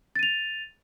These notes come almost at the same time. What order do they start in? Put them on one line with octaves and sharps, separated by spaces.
A6 D#7 F7